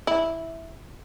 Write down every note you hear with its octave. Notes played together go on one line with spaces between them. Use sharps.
E4